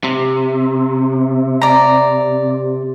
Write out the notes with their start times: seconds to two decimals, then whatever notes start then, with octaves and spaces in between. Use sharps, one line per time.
0.04 C3
1.61 D5 A#5